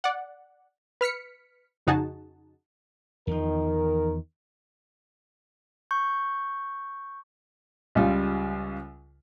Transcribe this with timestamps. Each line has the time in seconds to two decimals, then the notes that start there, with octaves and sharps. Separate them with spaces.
0.04 D5 F#5
1.01 B4 F6 B6 C#7
1.87 F2 C#3 D#4 F#4 G#4 A5
3.27 E2 D#3 F3 A#4
5.91 C#6 G6
7.95 C#2 C#3 G3 F4